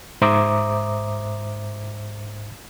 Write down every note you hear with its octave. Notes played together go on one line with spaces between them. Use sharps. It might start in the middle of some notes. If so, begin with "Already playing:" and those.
G#2 C5 E5 A#5 D6 D#6